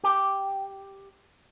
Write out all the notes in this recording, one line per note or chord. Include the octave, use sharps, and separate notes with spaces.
G4